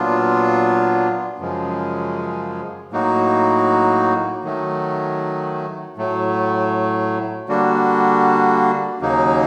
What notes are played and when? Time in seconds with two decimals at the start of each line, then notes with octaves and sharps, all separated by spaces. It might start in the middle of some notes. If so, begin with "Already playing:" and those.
Already playing: A#2 F#3 B3 D4 F4
1.39 F#2 C#3 F3 G#3
2.91 A2 F#3 A#3 D#4 F#4
4.44 D#3 F#3 A3
5.97 A2 F#3 A3
7.49 D3 G3 A#3 D4 F#4
9.01 D#2 C#3 F#3 A#3 D#4